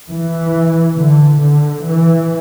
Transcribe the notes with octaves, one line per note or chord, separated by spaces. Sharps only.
E3
D3
D3
E3